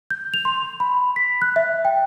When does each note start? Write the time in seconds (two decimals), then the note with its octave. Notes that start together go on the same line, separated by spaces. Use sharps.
0.10 G6
0.34 F7
0.45 C6
0.80 B5
1.16 B6
1.42 F#6
1.56 E5
1.85 G5